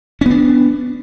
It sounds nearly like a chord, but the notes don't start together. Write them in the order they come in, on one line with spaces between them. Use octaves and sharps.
C#4 B3 D4